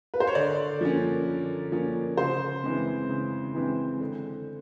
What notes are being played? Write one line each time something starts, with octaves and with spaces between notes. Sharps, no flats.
B4
C5
C#5
D3 D5
F3 A#3 C#4
D3
F3 A#3 C#4
C#3 C5
E3 G#3 C4
C#3
E3 G#3 C4
D3